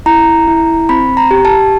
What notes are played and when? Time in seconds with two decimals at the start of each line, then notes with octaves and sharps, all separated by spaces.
0.06 E4 A#5
0.48 E4
0.89 C4 B5
1.17 A#5
1.31 G4
1.45 A5